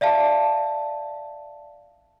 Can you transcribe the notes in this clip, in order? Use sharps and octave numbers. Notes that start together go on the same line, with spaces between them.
D5 E5 F5 A5